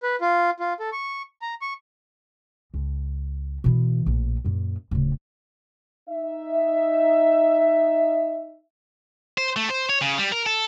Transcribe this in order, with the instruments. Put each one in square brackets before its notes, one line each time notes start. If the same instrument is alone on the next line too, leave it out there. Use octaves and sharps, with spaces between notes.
[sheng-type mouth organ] B4
F4
F4
A4
C#6
A#5
C#6
[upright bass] C#2
B2 E3
A#1 A2
F#2 A#2
D1 C#3
[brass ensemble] D#4 E5
[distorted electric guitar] C5
A3
C5
C#5
C#3
G3
A#4
A4